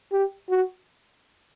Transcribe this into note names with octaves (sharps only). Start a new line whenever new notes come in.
G4
F#4